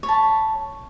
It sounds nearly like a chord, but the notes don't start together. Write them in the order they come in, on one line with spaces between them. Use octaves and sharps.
C#5 B5 A5